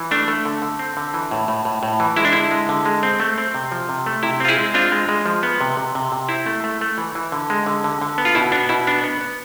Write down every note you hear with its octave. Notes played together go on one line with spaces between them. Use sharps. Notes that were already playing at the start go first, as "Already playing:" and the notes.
Already playing: E3
A3 D4
A3
D3
D3
C4
D3
E3
A2
A2
A2
A2
E3
G#3 E4
D4
D3 E4
G#3
D3
G#3
C4
A3
C4
C3
F3
C3
A3
C3 E4
C4 F4
E4 G#4
G#3
C4 D4 F4
G#3
G#3
F3
B3
C3
C3
C3
C3
C4 E4
A3
A3
A3
E3
E3
D3
G#3
D3
D3
D3
B3
F4
B2 E4
B3 D4
B2 E4
B3 D4
B3
B3